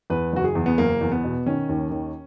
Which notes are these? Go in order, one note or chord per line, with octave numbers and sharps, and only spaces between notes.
E2 B4
F#1 F#4
G#4
E2
B3
F#1 A#3
E2
B3
B2
D#3 C#4
D#2
D#3